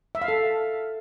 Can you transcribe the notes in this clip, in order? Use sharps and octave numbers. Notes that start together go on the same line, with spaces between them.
E5
F5
A4